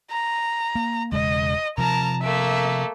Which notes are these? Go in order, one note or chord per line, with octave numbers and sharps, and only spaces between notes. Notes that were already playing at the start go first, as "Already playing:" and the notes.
A#5
A#3
E1 C#3 G#3 D#5
C3 F3 A#4 A5 A#5
A3 A#3 E5